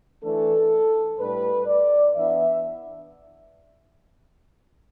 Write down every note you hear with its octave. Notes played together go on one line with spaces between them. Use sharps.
E3 A3 D4 A4
A2 G3 D4 B4
D5
E3 B3 D4 E5